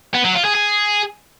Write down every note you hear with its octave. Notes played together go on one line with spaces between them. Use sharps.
B3
F#3
F4
G#4
G#4